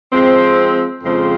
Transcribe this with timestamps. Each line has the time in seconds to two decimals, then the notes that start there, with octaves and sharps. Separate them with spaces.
0.12 F3 G#3 C4
1.02 F2 C#3 F3 G#3 C4